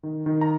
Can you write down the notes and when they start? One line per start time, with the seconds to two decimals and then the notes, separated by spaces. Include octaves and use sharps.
0.03 D#3
0.26 D#3
0.41 A#5